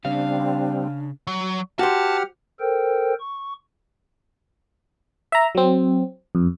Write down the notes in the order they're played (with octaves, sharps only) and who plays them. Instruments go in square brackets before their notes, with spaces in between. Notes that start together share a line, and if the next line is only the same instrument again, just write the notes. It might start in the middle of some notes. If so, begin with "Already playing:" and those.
[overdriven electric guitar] C#3 [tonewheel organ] G3 C4 [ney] D4 [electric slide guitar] F5
[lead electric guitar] F#3
[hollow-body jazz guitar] F#4 C5 [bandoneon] G4 F#5 F6 [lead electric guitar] A5
[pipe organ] A4 A#4 C5 G5
C#6
[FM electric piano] E5 A#5
F#3 C4
F2